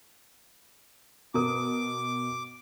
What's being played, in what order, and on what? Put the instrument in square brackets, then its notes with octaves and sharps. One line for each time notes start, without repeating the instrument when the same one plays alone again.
[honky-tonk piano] B2 A#4 D#6 [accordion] D6